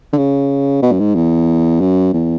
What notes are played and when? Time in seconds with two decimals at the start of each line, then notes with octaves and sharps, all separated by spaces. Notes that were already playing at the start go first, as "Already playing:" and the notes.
0.13 D3
0.18 C#3
0.82 B2
0.92 F#2
0.99 G#2
1.15 E2
1.81 F#2
2.13 E2